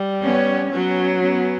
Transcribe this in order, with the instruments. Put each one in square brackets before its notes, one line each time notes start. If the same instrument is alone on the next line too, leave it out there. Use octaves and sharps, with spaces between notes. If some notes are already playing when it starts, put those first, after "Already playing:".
Already playing: [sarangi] G3
[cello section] B3 C#4
[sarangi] F#3 [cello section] B3 C#4
[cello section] B3 C#4